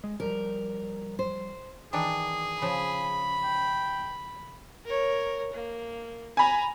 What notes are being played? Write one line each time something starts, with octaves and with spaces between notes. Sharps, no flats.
G#3
F3 G3 A#4
C5
D#3 E3 D4 G#4
C#3 F3 B5
G5
A#4 C#5
A#3
G#5 A#5 B5